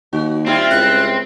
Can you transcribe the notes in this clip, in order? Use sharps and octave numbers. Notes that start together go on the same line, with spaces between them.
D#2 F#4
G3 C4 E4 F4
C#2 F#6